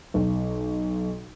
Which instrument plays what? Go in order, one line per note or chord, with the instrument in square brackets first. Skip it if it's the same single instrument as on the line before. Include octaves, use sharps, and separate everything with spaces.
[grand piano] B1